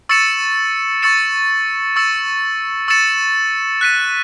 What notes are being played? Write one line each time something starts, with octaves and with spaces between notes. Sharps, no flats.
C#6 E6 A6 C#7 E7
C#6 E6 A6 C#7 E7
C#6 E6 A6 C#7 E7
C#6 E6 A6 C#7 E7
F#6 B6 D#7